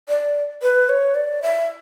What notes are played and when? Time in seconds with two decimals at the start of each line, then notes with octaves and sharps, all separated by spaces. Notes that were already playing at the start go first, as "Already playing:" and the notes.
0.09 D5
0.62 B4
0.89 C#5
1.15 D5
1.42 E5